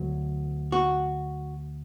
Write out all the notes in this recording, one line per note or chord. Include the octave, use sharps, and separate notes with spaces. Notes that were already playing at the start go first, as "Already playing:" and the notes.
Already playing: D2 F#3
F#4